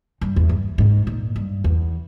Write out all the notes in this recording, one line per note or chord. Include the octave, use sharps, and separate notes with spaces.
G2
E2
G2
G#2
A#2
G2
E2